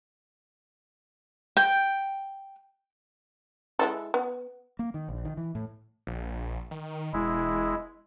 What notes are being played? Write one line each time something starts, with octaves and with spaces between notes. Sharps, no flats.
G5
G#3 E4 A4
B3
A#3
D#3
A#1
D#3
E3
A2
A#1
D#3
E1 G#3 E4